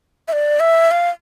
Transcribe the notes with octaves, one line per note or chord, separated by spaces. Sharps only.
E5
D5
E5
F5